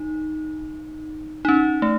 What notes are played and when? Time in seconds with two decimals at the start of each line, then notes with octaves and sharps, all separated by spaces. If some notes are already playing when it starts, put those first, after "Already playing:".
Already playing: D#4
1.45 D#4
1.48 C#4
1.82 A3